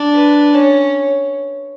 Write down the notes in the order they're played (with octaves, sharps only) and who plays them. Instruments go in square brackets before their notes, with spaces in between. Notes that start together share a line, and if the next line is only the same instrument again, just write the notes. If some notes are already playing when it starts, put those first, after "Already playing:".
Already playing: [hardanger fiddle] D4
[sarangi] B4
[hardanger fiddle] C#4 [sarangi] C#5